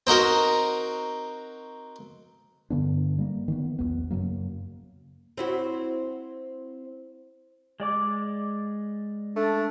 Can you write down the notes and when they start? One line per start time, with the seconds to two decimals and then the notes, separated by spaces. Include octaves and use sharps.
0.07 C4 D#4 F#4 A#4
2.70 G2 D3 B3 D4
3.18 G3 A#3
3.48 D#3 E3 B3
3.79 A#1 E2 B3
4.10 F#2 C#3 F#3 A#3
5.38 C4 E4 F#4
7.80 G#3 D5 D6
9.36 A3 D4